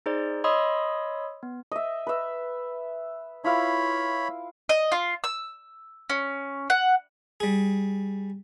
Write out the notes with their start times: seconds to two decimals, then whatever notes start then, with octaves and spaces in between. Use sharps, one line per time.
0.06 D#4 G#4 C5 D5
0.44 C#5 D#5 B5 C6 D#6 E6
1.43 B3
1.72 D#5 E5
2.07 B4 E5
3.44 E4 F4 C#5 F5 B5
4.69 D#5
4.92 F4
5.24 E6
6.10 C#4
6.70 F#5
7.40 G3 G#4